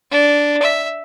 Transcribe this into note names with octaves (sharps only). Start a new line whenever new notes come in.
D4
E5